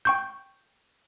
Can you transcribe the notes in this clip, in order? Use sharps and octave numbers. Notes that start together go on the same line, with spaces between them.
G5 C#6 G6